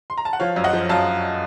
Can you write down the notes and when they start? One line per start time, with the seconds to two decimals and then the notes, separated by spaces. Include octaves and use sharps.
0.10 C6
0.17 A#5
0.25 A5
0.33 F#5
0.40 F3 C#5 F5
0.56 F#2
0.64 D#5 F#5
0.73 F3
0.89 F#2 F5 A5